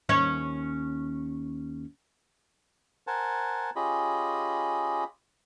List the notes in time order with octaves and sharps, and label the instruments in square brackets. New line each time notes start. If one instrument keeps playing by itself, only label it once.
[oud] D#2 C#4 C#5
[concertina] A#4 C5 F#5 G#5 A5
C#4 F4 G4 G#4 D#5 B5